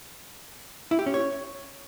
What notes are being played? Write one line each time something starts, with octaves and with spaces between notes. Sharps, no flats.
E4
G4
C#4
C#5